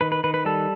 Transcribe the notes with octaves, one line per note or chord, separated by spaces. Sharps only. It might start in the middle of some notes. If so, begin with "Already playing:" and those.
D#3 B4
B4
D#3 B4
B4
G3 A4